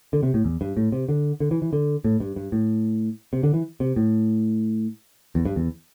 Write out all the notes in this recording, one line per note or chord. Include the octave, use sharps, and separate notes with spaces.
D3
C3
A2
E2
G2
A2
C3
D3
D3
E3
E3
D3
A2
G2
G2
A2
C3
D3
E3
C3
A2
E2
G2
E2